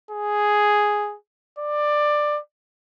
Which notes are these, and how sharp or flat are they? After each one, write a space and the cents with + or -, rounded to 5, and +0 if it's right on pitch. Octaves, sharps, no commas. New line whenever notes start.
G#4 +0
D5 +15